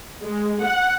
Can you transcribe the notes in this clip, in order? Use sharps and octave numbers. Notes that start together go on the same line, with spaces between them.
G#3
F#5